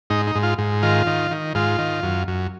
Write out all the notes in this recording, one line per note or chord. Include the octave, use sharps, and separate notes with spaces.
G#2 D#4
D#4
G#2
F4
G#2
D#3 F4
D#3
D#3
G#2 F4
D#3
F#2
F#2